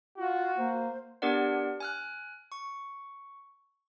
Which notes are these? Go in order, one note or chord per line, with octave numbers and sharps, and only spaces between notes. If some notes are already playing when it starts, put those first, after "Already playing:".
F4 F#4
A#3 C5
B3 D4 G4 A#4 D5 F#5
G#5 F6 F#6
C#6